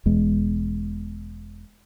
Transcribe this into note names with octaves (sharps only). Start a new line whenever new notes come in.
E1 E2 G#3